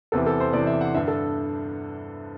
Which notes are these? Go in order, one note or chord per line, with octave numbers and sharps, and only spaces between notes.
E2 C3 E3 A4
A4
C5
E2 C3 E3 D5
E5
F#5
G2 D3 E5
A4